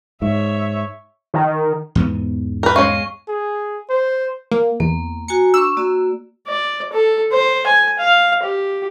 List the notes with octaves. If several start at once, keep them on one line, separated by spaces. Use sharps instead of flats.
G#2 C#5 E5
D#3
E2 G#2 B3
A#4 B4
G#3 C#4 F5 C#6
G#4
C5
A#3
E2 A#3
F#4 G#5 A#5 C#7
D4 C#6 E6
A#3 F#4 D5
D5
A4
C5
G#5
F5
G4